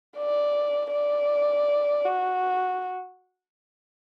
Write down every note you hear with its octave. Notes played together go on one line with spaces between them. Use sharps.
D5
D5
F#4